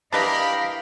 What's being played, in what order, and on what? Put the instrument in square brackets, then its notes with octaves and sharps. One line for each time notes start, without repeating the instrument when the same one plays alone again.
[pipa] D4 B4 D#5 [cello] E4 A#4 [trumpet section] G4 B5 [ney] F5